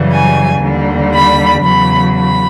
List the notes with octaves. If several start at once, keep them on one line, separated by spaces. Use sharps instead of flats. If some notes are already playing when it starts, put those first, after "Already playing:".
Already playing: F#2 C#3 E3 G3
G#5
D#2 D3 G3
B5
E2 C#3 F#3 B5
B5